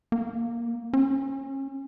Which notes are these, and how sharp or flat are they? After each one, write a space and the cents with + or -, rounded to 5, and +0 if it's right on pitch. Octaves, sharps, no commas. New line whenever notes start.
A#3 +10
C#4 -30